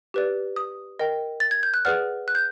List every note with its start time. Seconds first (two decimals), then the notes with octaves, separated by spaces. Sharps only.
0.14 G4 B4 D5
0.56 D#6
0.99 A#4 D#5 G5
1.40 A6
1.51 G#6
1.63 G6
1.74 F#6
1.85 G#4 B4 D5 F#5 F6
2.28 F#6
2.35 G6